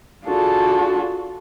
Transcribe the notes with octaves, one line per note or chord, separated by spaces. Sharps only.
D4 F4 F#4 G#4 A4